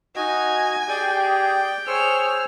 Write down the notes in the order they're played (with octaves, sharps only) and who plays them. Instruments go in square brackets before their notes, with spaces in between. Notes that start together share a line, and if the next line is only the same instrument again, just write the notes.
[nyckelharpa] D#4 [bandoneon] F#4 D#5 [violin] G#5
[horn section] G4 G#4 [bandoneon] D5 [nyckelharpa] G5
[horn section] G#4 C#5 [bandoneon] C5 E6 [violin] F6